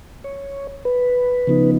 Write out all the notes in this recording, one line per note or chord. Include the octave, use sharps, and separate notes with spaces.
C#5
B4
C#3 F3 B3 D#4